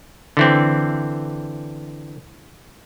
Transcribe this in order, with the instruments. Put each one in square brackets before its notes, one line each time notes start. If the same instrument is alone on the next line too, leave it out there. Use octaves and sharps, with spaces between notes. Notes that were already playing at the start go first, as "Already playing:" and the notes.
[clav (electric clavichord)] D3 E3 C4